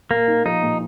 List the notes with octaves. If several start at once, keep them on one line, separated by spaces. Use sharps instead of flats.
A#2 A#3
D#4
F3 D#4
A#2